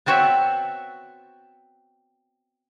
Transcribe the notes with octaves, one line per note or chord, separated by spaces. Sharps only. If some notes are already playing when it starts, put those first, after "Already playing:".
B3 C4 F#4 C#5 E5